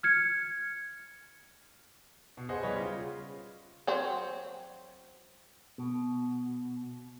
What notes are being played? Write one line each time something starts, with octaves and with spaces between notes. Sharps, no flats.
F6 G#6 C#7
B2
G#4 B4 C5 D#5 F#5 G#5
G3 B3 G#4 C#5 D#5 B5
C#3 F4
F#3 C4
B2